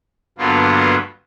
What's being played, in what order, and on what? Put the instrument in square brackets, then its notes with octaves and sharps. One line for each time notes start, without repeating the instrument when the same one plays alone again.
[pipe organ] G2 D3 F#3 A#3 B3 F4